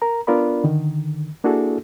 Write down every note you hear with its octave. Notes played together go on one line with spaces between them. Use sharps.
A#4 A#5
B3 D4 F4 A#4 D5 B5
D3 D#3
A#3 D4 E4 F#4 G#4 A4